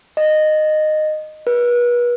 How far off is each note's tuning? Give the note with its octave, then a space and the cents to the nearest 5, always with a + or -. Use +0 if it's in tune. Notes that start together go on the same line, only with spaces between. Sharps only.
D#5 -15
B4 -35